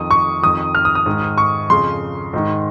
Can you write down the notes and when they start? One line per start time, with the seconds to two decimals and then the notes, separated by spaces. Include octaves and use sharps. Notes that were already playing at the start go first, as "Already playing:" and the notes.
Already playing: F2 D#3 D#6
0.11 C#6
0.43 F2 D#3 D#6
0.75 F6
0.85 D#6
0.95 D#6
1.06 G#2 D#3
1.38 C#6
1.70 F2 C#3 C6
2.33 G#2 D#3